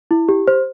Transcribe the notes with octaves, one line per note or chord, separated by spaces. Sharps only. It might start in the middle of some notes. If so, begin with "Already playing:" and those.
E4
G4
C5